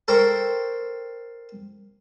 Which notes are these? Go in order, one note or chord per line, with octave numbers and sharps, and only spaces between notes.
A4 A#4 C5 G5 C#6